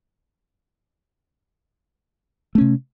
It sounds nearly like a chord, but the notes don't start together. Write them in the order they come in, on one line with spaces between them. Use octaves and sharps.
A3 C#4 C3